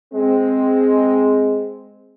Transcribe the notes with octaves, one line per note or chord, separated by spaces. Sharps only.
G#3 C4